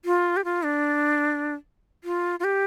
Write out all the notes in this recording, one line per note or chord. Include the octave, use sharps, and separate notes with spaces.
F4
G4
F4
D4
F4
F4
G4